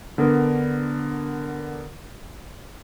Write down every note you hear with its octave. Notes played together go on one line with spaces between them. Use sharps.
D3 B3 D4 A#4